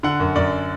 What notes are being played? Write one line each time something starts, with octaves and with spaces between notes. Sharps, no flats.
D3 F#5
F#2
F#2 D5